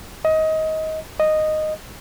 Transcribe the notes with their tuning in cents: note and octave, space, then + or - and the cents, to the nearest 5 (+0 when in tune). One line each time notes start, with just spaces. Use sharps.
D#5 +25
D#5 -5